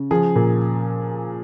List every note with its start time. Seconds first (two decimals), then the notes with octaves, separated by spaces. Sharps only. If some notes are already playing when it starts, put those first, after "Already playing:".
Already playing: C#3
0.11 F3 G#4
0.36 A#2